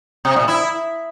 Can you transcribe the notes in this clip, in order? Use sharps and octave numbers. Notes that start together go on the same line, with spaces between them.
C3
A#2
E4